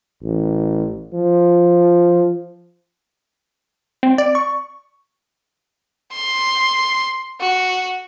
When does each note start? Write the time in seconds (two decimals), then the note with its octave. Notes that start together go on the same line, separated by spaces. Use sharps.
0.23 A1
1.14 F3
4.03 C4
4.18 D5
4.35 C#6
6.13 C6
7.40 F#4